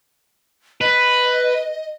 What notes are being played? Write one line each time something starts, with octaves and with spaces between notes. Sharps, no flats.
B4 D#5